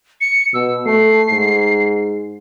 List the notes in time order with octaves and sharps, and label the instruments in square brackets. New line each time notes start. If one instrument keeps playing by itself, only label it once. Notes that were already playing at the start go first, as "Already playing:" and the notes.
[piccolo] C#7
[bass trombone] B2 [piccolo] E6
[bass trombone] A3 [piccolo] C7
[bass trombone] G#2